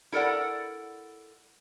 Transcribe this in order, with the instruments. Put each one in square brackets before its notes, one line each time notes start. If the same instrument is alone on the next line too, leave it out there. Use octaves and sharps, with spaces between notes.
[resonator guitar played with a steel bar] E4 A4 A#4 D5 F#5